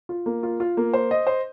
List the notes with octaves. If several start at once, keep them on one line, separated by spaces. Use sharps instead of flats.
F4
A#3
F4
F4
A#3
C5
D#5
C5